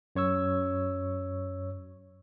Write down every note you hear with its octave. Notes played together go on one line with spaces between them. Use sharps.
F#2 C#5 C#6 E6